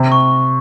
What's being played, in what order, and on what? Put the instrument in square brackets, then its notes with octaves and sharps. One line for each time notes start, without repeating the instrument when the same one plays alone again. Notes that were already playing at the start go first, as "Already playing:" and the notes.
Already playing: [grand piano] C3
[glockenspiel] C#6